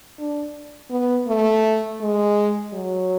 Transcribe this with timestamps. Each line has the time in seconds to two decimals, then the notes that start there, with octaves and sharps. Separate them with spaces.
0.18 D4
0.91 B3
1.27 A3
2.01 G#3
2.74 F#3